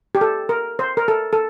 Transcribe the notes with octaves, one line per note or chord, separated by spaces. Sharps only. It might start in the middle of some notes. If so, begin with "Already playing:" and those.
G4
A4
A#4
C5
A#4
A4
A4